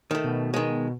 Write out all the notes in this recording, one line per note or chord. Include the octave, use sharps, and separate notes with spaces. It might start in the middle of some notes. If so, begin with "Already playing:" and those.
D#3 A3
B2
D#3 G#3